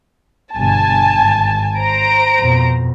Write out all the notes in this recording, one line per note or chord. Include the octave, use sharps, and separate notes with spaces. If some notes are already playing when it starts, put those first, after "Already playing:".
G1 B2 G#5 A5
G#1
C5 A#5 D7
F2 B2